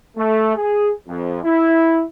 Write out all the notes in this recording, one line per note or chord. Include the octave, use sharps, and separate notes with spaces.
A3
G#4
F2
E4